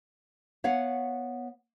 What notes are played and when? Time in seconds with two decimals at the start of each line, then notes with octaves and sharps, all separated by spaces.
0.64 B3 C#5 F5 F#5